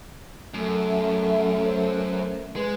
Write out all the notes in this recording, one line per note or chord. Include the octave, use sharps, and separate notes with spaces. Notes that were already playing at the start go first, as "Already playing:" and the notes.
F#2 A3
E5
C5
G#3 B4